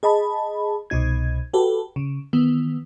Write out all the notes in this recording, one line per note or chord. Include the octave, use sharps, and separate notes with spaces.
G#4 D#5 A5 B5
C2 B2 D#4 G#6
F#4 G4 A4 B4
C#3
D#3 E3 B3